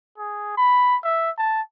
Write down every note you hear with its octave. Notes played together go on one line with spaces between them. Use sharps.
G#4
B5
E5
A5